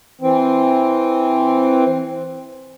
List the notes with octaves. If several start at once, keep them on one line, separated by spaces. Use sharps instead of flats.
E3 C4